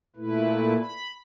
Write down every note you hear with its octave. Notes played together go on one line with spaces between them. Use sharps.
A#2 A3 E4 B4
B5